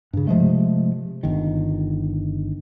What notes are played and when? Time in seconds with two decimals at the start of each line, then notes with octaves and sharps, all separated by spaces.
0.13 G2 C#3
0.27 C3 F3 G#3 A3
1.23 G1 D#3